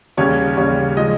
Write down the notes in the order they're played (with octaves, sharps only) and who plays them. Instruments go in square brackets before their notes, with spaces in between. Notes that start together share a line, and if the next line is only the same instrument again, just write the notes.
[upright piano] D#2 C#3 G3 C#5
D#2 C#3 G3 C#5
F3 G#3 D#5